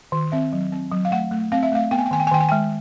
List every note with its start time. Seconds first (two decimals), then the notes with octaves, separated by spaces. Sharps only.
0.12 D#3
0.32 C4 E5
0.53 F#3
0.72 C4
0.91 F#3
1.05 F5
1.11 A3 F#5
1.31 A3
1.52 C4 F5
1.63 E5
1.72 A3 F5
1.91 B3 G5
1.99 G#5
2.06 G5
2.11 D#3 G#5
2.20 G5
2.27 G#5
2.31 D#3 G5
2.41 G#5
2.49 G5
2.52 G#3